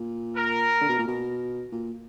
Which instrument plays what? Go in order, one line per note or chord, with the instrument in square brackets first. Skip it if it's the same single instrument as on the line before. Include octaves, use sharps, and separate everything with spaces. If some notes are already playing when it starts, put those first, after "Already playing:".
Already playing: [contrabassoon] A#2
[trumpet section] A#4
[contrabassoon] D3
B2
A#2
B2
A#2